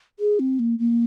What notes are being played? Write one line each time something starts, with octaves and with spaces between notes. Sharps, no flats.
G#4
C4
A#3
A#3